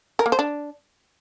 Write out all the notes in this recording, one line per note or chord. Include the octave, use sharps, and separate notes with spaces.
A#4
A#3
C5
D4